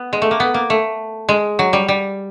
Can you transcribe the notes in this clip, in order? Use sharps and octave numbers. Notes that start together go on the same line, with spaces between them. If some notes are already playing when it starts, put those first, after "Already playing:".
Already playing: B3
G#3
A3
A#3
B3
A#3
A3
G#3
F#3
G3
G3